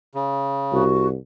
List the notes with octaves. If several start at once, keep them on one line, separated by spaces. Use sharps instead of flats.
C#3
C2 F#4